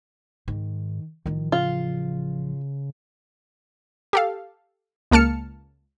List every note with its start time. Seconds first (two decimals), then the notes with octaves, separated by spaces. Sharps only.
0.48 G#2 D#3
1.26 A1 D#3 F3
1.52 C#3 F4
4.13 G4 A4 F5
5.11 C#2 A#3 A5 F6 C#7